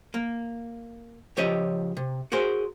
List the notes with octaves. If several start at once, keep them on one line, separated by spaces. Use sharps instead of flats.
A#3
C#2 F3 G4 C#5 D#5 E5
C3
F#4 G#4 A#4 C5